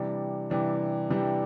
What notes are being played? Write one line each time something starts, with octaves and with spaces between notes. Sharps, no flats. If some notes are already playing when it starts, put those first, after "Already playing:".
Already playing: C3 E3 G3 D4
C3 E3 G3 D4
C3 E3 G3 D4